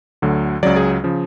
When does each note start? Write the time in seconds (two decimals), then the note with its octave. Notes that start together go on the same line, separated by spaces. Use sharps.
0.22 D2 D3 F#3
0.63 C#2 C#3 F#3 D5
0.76 G#4
1.04 C#3 F3